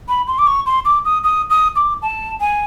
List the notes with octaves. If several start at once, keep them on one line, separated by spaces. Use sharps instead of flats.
B5
C6
D6
C#6
C6
D6
D#6
D#6
D#6
D6
A5
G#5